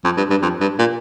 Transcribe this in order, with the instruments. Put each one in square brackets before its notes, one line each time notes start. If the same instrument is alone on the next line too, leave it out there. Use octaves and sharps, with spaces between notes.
[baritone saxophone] F2
G2
G2
F2
G2
A#2